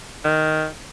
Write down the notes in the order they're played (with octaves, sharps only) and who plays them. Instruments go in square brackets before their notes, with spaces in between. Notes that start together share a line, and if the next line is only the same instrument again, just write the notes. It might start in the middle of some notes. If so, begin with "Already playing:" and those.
[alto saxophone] D#3